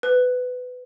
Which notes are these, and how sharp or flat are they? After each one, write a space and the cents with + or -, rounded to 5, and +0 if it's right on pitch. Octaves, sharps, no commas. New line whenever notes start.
B4 +20